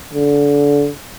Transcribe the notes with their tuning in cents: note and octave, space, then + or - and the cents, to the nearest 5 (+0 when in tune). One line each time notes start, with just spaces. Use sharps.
D3 -25